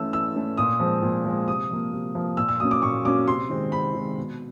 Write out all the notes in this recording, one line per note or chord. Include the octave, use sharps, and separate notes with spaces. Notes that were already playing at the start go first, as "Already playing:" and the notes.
Already playing: E3 A3 C#4 E6
E3 E6
A3 C#4
A#2 D#6
F3 G#3 C4
A#2
F3 G#3 C4
C3 D#6
F3 A#3
C3
F3 A#3
A#2 E6
E6
F#3 A#3 C#4 D#6
D6
A#2 C#6
F#3 A#3 C#4 D6
C3 C6
D#3 G#3 C4
C3 B5
D#3 G#3 C4
B2